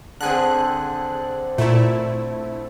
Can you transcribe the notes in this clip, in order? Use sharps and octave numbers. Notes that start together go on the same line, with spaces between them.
D3 C4 G#4 F#6
A#2 A3 E4